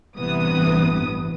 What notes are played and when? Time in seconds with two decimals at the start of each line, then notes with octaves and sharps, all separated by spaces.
0.16 A1 G2 C3 E3 B3 D#6